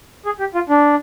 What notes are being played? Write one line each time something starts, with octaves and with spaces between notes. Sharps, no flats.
G#4
G4
F4
D4